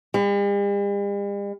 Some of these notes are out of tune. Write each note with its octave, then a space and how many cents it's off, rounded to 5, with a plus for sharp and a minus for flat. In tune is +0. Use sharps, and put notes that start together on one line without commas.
G3 +45